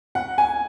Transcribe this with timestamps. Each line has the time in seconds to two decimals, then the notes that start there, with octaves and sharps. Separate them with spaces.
0.15 F#5
0.38 G#5